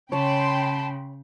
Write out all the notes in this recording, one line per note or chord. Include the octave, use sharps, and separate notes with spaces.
C#3 C#5 G5 A5 B5 C6